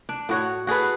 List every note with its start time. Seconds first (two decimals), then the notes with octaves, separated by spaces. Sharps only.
0.09 D4
0.29 A2 F#4 C#5
0.67 F#4 G#4 A4 B4